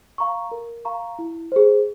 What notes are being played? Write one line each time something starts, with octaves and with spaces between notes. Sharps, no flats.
F5 A#5 C#6
A#4
F5 A#5 C#6
E4
G#4 C5